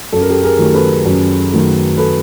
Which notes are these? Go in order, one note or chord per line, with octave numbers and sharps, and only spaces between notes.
F#2 A4
A#4
G4 A4
G#4 A#4
D#3 F#3 A3
A4 B4
F#2
D#3 F#3 A3
A4 B4